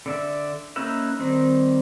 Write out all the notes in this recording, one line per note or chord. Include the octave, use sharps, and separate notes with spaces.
D3 D5 E5
A#3 C#4 D#4 B4 E5
D#3 G3 C4